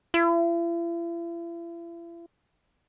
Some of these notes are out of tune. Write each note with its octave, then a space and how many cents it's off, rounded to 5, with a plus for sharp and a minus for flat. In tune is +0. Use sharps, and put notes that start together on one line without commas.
E4 +45